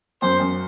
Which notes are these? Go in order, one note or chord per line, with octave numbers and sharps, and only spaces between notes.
F#2 C5
F#2